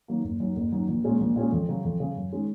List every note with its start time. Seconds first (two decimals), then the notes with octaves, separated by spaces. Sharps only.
0.08 D#3 F#3 A#3
0.24 F#1
0.40 F#2 D#3 F#3
0.56 F#1
0.72 F#2 D#3 F#3
0.88 A#1
1.04 A#2 G#3 C#4 G#4
1.20 A#1
1.36 A#2 G#3 C#4 G#4
1.52 F2
1.69 C#3 F#3
1.85 F2
2.00 C#3 F#3
2.16 F#2
2.32 D#3 G#3 C#4